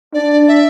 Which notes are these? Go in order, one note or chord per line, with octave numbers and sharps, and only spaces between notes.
D4 D5
E5